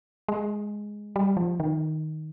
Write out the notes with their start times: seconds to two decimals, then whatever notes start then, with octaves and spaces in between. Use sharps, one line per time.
0.28 G#3
1.16 G3
1.37 F3
1.60 D#3